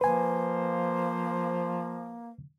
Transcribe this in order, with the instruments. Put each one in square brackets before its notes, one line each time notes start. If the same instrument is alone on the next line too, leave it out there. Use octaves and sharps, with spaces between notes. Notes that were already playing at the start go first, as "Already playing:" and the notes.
[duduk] F3 [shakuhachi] A#3 [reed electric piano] B4 G#5 [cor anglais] C5